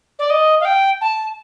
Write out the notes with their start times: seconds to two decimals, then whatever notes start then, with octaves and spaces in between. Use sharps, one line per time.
0.19 D5
0.30 D#5
0.60 F5
0.65 G5
1.01 A5